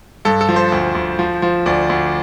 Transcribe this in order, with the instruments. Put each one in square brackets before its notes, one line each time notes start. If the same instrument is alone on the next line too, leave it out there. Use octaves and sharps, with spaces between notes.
[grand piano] G2 A4
A4
F3
C5
D2
D2
F3
F3
D2 D5
D2